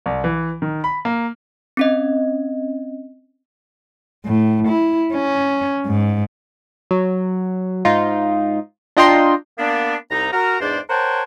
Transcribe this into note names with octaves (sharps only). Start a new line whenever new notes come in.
C2
E3
D#3
B5
A#3
C4 C#4 D#5
A2
E4
C#4
G#2
F#3
G#2 D#4 F4
D4 F4 D#5 G5 A#5 C6
A#3 B3 D4
C2 D#4 A#5
F#4 A#4 A#5
E2 G#2 D4 C5 D5
A#4 C5 C#5 F#5 G5 A5